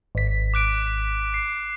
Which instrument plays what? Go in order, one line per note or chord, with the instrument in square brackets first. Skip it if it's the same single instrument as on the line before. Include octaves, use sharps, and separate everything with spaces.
[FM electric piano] G#1 B6
[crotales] D6 F#6 D7
C7